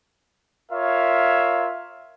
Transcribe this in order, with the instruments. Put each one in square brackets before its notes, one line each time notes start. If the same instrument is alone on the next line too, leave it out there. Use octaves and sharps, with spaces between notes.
[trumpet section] F4 A#4 C#5 E5 F5